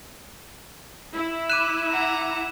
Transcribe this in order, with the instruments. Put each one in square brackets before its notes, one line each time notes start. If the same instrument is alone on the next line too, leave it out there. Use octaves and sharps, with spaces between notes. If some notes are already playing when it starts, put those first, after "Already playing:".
[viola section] E4
[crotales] D6 E7 [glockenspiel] F#6 D#7
[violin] F#5 A#5